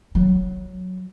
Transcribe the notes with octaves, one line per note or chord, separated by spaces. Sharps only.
F#3